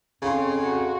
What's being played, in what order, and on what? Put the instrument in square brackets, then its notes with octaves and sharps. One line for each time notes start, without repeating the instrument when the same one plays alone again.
[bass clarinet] F2 [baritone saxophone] C#3 [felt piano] F5 C6
[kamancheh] F#4